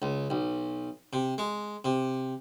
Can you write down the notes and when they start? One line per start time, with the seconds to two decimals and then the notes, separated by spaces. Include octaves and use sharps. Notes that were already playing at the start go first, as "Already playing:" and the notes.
0.02 C#2
0.30 B1
1.13 C3
1.38 G#3
1.85 C3